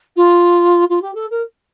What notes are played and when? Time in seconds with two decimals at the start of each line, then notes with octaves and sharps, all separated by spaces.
0.16 F4
0.89 F4
1.02 G4
1.15 A4
1.31 A#4